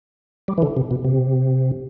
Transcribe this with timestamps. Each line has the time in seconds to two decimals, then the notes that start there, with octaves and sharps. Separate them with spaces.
0.48 G3
0.58 E3
0.62 D3
0.77 C3
0.91 B2
1.05 C3